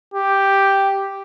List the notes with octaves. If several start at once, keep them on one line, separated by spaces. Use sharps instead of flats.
G4